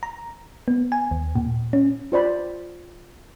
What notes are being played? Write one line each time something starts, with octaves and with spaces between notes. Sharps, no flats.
A#5
B3
G#5
D#2
A#2
C#4
F4 C5 D5 B5